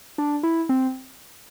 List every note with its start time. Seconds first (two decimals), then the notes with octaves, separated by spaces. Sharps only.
0.18 D4
0.43 E4
0.69 C4